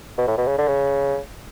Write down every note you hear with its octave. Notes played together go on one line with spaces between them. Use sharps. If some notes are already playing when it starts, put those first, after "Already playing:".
B2
A2
B2
C#3
D3
C#3